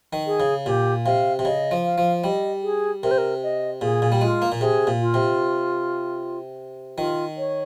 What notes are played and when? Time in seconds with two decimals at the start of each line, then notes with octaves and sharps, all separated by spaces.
0.13 D#3
0.27 G#4
0.40 C#3
0.66 A#2 G4
1.05 C3 F5
1.39 C3
1.45 C#3 D#5
1.71 F3
1.84 F5
1.98 F3
2.24 G3 D#5
2.63 G#4
3.03 C3 A#4
3.11 C5
3.18 A#4
3.43 D#5
3.81 A#2 G#4
4.02 A#2
4.12 G3
4.21 G#3 F4
4.42 A#3
4.52 A#2
4.61 C3 G#4
4.87 A#2
5.00 F4
5.14 C3
6.97 D#3 F4
7.38 C#5